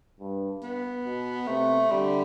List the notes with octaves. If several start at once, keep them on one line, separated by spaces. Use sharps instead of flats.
G2
B3
B2
C3 A3
D3 G3